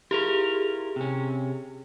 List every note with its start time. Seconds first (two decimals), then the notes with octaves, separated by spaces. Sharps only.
0.11 E4 F4 G4 G#4 A#4
0.96 C3 C#4